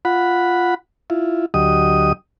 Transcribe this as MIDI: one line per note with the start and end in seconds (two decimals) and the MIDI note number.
0.05 0.74 65
0.05 0.74 78
0.05 0.74 83
1.10 1.46 64
1.10 1.46 65
1.54 2.12 38
1.54 2.12 54
1.54 2.12 67
1.54 2.12 75
1.54 2.12 87